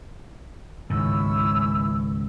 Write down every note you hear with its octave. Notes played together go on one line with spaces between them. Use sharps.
C#2 G#2 D#3 C#4 E4 E6